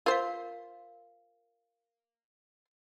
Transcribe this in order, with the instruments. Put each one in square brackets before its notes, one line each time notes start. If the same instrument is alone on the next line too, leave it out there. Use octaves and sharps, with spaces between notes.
[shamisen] F4 C5 [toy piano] A#4 F5